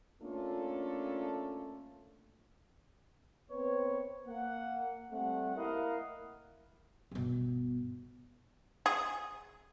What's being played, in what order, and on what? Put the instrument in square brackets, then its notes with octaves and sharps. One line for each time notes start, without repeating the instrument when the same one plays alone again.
[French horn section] A3 A#3 C#4 D4 F4 A4
[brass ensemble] B3 C4 B4 C#5
A#3 F#5
G3 A3 C4 F#5
A#3 E4 A#4 D#5 F5 F#5
[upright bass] G1 B2
[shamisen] G#4